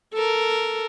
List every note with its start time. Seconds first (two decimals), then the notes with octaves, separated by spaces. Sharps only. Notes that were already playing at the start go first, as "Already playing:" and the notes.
0.14 A4 A#4